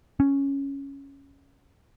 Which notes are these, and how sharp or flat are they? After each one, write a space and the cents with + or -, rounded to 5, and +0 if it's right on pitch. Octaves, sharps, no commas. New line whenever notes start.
C#4 +0